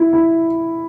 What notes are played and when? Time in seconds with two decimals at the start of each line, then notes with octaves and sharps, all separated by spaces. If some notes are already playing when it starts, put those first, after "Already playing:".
Already playing: E4
0.13 E4